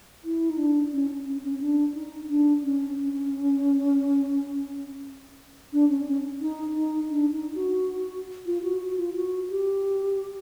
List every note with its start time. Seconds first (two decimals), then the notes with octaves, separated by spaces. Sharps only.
0.24 E4
0.50 D#4
0.58 D4
0.93 C#4
1.26 C#4
1.43 C#4
1.61 D4
1.95 D#4
2.29 D4
2.64 C#4
2.98 C#4
5.73 D4
5.89 C#4
6.07 C#4
6.41 D#4
6.76 D#4
7.10 D4
7.33 D#4
7.55 F#4
8.46 F4
8.63 F#4
8.81 F#4
8.98 F4
9.16 F#4
9.50 G4